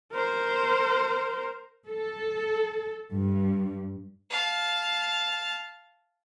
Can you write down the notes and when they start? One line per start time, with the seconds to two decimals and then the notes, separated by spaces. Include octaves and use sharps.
0.12 A#4 C5
1.88 A4
3.12 G2
4.30 F5 A5